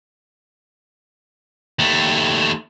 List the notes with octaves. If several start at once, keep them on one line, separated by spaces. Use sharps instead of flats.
D#2 A3